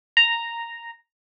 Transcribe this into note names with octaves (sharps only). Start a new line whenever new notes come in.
A#5